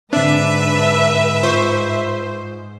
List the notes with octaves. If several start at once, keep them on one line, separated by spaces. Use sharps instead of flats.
G#2 D3 C4 D4 B4 E5
F4 C5 C#6